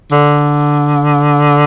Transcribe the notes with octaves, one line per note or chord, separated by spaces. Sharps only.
D3